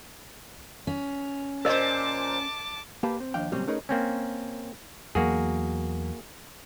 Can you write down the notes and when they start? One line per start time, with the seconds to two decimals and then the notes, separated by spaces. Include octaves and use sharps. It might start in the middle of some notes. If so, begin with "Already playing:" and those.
0.87 C#4
1.65 A#2 G#4 A#4 C5 D#5 A5 D6
3.03 A#3 G4 B4 F5 A5
3.20 C4
3.34 D#2 F3 D4 F5 G5
3.52 C#2 A#2 F#3 G3 C4 C#4
3.67 A3 C#4 D#4 G#4 A#4 B4
3.89 A#3 C4 C#4
5.15 E2 F#3 A#3 F#4 G#4